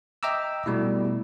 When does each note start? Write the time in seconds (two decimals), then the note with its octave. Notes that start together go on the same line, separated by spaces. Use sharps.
0.23 D#5 E5 G5 A#5 D6 E6
0.66 B2 G3 A3 E4